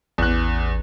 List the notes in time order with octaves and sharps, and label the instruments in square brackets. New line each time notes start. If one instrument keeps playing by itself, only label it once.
[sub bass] A1 [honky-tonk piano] E2 F#6